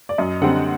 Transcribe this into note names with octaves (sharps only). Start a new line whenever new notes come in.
D5
F#2 D#5
D3 G3 C4 F#5